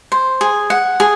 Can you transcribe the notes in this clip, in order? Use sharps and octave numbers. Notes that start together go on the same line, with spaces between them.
C5
G#4
F#5
G#4